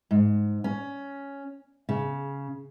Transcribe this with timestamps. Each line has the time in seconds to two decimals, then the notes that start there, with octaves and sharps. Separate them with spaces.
0.11 G#2
0.64 C#4
1.89 C#3